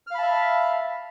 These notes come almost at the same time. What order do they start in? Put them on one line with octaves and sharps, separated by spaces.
F6 F5 B5 A5 E5